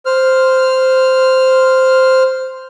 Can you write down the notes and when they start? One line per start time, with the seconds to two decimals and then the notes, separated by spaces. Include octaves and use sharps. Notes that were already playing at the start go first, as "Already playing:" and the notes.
0.06 C5 F6